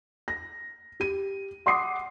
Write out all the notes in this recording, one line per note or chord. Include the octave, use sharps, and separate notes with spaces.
A#6
G4 D#7
F#5 C6 D6 D#6 C7